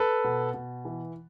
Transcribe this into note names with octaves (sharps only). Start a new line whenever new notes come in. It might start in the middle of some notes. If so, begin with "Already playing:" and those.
Already playing: A4 B4
B2
B2
E3